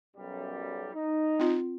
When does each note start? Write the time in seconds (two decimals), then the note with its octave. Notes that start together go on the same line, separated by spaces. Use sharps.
0.17 B1 F#2 G3
0.94 D#4
1.39 C4 F4